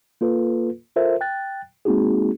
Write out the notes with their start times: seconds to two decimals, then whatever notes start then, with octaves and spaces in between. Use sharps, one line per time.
0.21 A#3 F4 A4 B4
0.96 F4 A4 A#4 C5 E5
1.21 G5 F#6 A6
1.85 G#3 A#3 C4 D#4 F#4 G#4